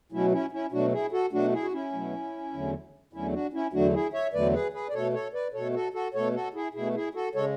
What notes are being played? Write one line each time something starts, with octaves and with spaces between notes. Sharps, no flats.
B2 F#3 A3 C#4 E4
C#4 E4
C#4 E4
B2 F#3 A3 D4 F#4
E4 G#4
F#4 A4
B2 F#3 A3 D4 F#4
E4 G#4
F#4
C#4 E4
B2 F#3 A3
E2 D3 F#3 A3
E2 D3 F#3 A3 C#4 E4
D4 F#4
C#4 E4
E2 D3 F#3 A3 D4 F#4
E4 G#4
C#5 E5
E2 D3 F#3 A3 B4 D5
G#4 B4
G#4 B4
D5
B2 A3 A4 C#5
A4 C#5
B4 D5
B2 A3 A4 C#5
F#4 A4
F#4 A4
B2 A3 A4 C#5
F#4 A4
E4 G#4
B2 A3 E4 G#4
E4 G#4
F#4 A4
C#3 G#3 A4 C#5